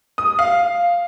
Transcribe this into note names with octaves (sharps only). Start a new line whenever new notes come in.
D#6
F5